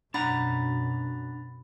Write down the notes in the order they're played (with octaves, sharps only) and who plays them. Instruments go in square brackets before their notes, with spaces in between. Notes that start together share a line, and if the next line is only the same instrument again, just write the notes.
[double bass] F#2 B2 [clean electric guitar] D4 F#5 A#5 [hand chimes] B5 A6